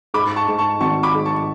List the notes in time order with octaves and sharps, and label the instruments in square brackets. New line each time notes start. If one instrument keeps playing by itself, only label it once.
[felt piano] G#2 [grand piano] B5 D6
[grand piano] A5 C#6
[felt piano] G#2
[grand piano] A5 C#6
[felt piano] G#1 [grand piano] A5 C#6
[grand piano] B5 D6
[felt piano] G#2
[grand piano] A5 C#6